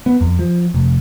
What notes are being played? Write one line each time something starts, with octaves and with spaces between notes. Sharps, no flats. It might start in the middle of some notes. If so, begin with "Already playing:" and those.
B3
F2
F3
F1